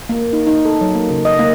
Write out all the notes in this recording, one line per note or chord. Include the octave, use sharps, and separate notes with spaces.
A#3
D#4
D#4
A4
F#3
A#3
C#3
D#5
A#3